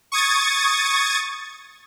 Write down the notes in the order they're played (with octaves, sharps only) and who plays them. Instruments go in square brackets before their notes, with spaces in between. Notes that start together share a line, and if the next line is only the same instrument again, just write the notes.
[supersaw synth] C#6 D#6 G#6 A6